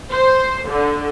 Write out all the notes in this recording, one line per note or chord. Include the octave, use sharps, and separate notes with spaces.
C5
D3